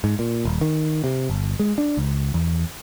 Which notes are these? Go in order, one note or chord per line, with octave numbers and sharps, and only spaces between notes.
G#2
A#2
D#1
D#3
C3
G1
G#3
D4
C#2
E2